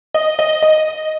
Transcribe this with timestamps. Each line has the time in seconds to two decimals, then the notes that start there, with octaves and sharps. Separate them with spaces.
0.15 D#5
0.39 D#5
0.63 D#5